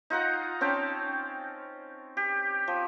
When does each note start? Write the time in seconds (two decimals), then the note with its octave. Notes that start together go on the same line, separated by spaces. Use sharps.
0.10 D#4 F4 F#5 A#5
0.61 C4 C#4 G5 A5
2.17 G4
2.68 F3